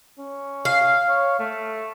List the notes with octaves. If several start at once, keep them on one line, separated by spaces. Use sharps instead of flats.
C#4
F5
C#5
A3